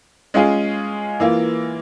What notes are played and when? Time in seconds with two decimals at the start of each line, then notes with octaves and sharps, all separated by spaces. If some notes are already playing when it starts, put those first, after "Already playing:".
0.34 G#3 C#4 F4 G#4
1.20 E3 A#3 F4